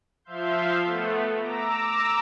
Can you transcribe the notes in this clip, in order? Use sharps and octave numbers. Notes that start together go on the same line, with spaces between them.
F3 E5 F5 C6 G6
A3 B3
A#5 D6 E6